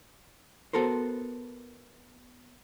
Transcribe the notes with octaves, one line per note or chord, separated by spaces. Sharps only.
B3 F#4 A4 A#4 C5